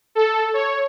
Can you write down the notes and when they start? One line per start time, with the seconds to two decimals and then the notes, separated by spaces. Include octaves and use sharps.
0.15 A4
0.54 C#5